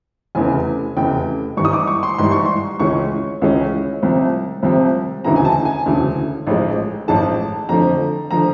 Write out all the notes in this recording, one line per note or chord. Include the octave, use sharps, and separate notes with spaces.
F1 E2 C#3 G#5
F1 E2 C#3 G5
G#2 E3 G3 C#6
D#6
D6
C#6
C6
G#2 E3 G3 C6
C#6
C6
C#2 C#3 E3 G#3 C#4 C#6
C#2 C#3 E3 G#3 C#4
C2 C3 F3
C2 C3 F3
E1 D2 C#3 E3 A#5
G#5
A5
G#5
E1 D2 C#3 E3
A1 G#2 F3 G#3
A1 G#2 F3 G#3 A5
F2 D3 F3 A3 A#5
D3 F3 A3 A#5